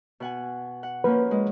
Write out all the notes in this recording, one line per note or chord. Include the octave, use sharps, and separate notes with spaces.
B2 F#5 G#5
F#5
F3 A#3 C#4 B4
G#3